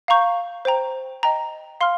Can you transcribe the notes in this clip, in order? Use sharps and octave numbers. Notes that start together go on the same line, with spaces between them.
F5 A#5 C#6 G6
C5 G5 A#5
D#5 G5 A#5
F5 C6 F6